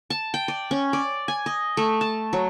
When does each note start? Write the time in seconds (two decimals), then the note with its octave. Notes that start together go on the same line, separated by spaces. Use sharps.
0.10 A5
0.34 G5
0.48 D5
0.71 C#4
0.93 D5
1.28 G#5
1.46 D#5
1.77 A3
2.01 A5
2.33 F#3